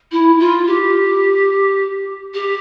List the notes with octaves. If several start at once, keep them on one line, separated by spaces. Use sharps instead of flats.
E4
F4
G4
G4